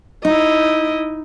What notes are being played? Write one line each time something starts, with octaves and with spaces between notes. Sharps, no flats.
D#4 E4 D#5